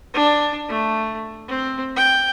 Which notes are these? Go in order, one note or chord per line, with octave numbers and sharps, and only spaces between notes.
D4
A3
C4
G5